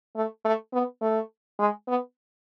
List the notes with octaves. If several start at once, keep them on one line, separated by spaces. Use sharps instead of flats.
A3
A3
B3
A3
G#3
B3